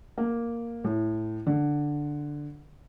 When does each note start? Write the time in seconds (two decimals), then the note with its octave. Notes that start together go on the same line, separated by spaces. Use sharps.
0.18 A#3
0.84 A2
1.47 D3